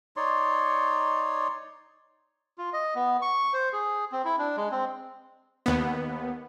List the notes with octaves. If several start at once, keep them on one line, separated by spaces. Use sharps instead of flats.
D#4 C#5 D5 C6
F4
D#5
B3
C#6
C5
G#4
C4
E4
D4
G#3
C4
D#2 B3